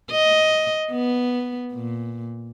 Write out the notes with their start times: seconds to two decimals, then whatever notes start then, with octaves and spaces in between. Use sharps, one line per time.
0.11 D#5
0.91 B3
1.73 A#2